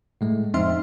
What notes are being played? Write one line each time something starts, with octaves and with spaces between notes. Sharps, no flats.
A2 G#3 A3
F2 C4 D#4 E5 C6 F6